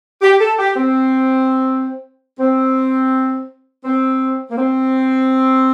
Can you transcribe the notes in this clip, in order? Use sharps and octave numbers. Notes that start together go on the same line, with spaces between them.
G4
A4
G4
C4
C4
C4
A#3
C4